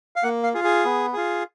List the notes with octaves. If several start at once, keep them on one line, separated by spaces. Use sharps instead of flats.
F5
A#3 F#5
F5
F4 G#4
G#4
B3
F4 G#4